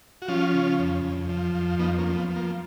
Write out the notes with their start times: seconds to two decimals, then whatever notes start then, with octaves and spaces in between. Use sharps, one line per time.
0.22 F#4
0.28 F3 C#4 F4
0.53 C#3
0.79 F2
1.04 F2
1.29 F3
1.55 F2
1.79 F2 B3 D#4
1.98 A#3 C#4
2.05 F3
2.17 B3
2.30 F3
2.36 A#3